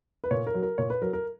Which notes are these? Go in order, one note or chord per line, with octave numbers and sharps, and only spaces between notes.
B4
A#2 C#5
A#4
F#3
A#4
A#2 C#5
B4
F#3 A#4
A#4